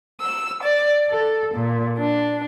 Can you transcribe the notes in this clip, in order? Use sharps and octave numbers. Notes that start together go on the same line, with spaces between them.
E6
D5
A4
A#2
D4